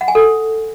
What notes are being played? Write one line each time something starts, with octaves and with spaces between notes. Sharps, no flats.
F#5
G#5
A4